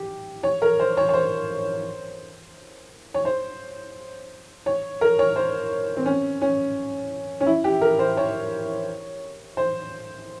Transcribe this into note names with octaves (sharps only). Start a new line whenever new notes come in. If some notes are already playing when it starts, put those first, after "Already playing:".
Already playing: G4
C#5
A#4
C5
C#5
C#5
C5
C#5
C5
C#5
A#4
C#5
C5
C4
C#4
C#4
C#4
E4
G4
A#4
C5
C#5
C5